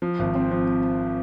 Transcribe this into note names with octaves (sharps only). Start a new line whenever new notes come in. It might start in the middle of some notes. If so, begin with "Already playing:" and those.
F3
G#1
C4
F3